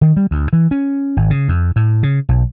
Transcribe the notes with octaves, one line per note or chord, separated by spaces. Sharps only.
D#3
G3
D2
E3
C#4
G#1
C#3
F2
A2
C#3
B1